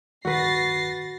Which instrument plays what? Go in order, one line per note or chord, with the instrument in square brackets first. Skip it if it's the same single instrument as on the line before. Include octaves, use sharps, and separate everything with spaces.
[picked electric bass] D1 G1 D#3 [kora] F#4 B4 [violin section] A6 A#6 C7